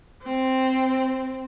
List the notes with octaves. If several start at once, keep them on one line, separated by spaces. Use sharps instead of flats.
C4